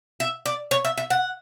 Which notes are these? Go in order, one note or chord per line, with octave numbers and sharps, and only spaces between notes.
E5
D5
C#5
E5
E5
F#5